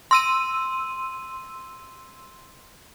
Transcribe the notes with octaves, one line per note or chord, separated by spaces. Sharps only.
C6 E6 D#7